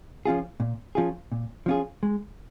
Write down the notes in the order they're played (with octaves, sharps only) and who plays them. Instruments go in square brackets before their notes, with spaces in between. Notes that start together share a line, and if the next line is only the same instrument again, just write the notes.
[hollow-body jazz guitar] F3 C#4 F4 G#4
A#2
F3 C#4 F4 G#4
A#2
F3 C#4 F4 G#4
G#3